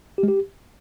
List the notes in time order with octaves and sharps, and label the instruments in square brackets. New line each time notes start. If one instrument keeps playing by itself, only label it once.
[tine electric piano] G4
G#3
G4